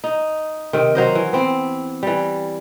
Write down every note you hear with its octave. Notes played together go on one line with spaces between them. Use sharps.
D#4
C3 D#3
F#3 C5 D#5
E3
B3 C4 E4
E3 G3